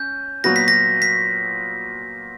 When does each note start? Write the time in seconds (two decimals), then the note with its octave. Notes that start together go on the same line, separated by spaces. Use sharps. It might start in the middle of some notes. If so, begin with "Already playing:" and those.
Already playing: C#4 G6
0.44 A#2 F#3 B3 F#4 A#6
0.56 B6
0.68 A#6
1.02 B6